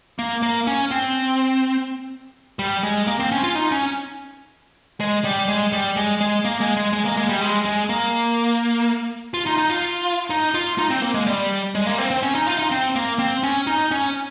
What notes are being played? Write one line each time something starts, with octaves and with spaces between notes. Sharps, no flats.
A#3
A#3
C#4
C4
G3
G#3
A#3
C4
C#4
F4
D#4
C#4
G#3
G3
G#3
G3
G#3
G#3
A#3
G#3
G#3
G#3
A#3
G#3
G3
G#3
G#3
A#3
F4
D#4
D#4
F4
D#4
F4
D#4
C4
A#3
G#3
G3
G#3
A#3
C4
C4
C#4
D#4
F4
D#4
C4
A#3
C4
C#4
D#4
C#4